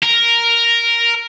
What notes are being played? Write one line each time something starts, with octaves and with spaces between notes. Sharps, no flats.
A#4